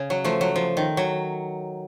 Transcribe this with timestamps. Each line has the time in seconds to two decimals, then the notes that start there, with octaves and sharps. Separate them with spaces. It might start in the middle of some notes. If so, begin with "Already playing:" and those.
Already playing: C#3
0.10 F#3
0.24 F3 A3
0.41 F#3
0.56 F3
0.77 D#3
0.97 F#3